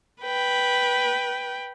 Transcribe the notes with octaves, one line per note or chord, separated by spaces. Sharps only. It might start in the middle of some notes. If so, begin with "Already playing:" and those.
B4 G5